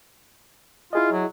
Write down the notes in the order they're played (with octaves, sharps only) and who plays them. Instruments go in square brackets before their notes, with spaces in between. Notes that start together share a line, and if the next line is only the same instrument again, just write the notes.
[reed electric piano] E4 G#4 D#5 [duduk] F4
[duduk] F#3